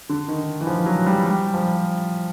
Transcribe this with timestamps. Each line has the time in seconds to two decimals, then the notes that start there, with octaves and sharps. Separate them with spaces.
0.09 D3
0.28 D#3
0.61 E3
0.67 F3
0.86 F#3
1.06 G3
1.26 G3
1.54 F3